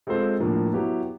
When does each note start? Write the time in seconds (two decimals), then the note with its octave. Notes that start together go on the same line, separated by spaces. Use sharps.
0.07 G#3 C4 F4 A4 C5
0.40 A2 F3 A#3 D4
0.73 F#3 B3 E4 G4